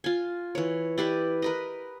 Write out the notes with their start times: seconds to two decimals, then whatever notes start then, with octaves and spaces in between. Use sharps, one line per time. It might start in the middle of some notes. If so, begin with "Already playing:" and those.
0.04 F4 G#5
0.55 E3 C#5
0.98 E4 G4 B4 D5
1.42 A#4 B4 D#5